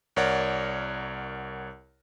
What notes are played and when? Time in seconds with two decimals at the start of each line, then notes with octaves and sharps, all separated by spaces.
0.16 C2 A#4 C#5 D5 F#5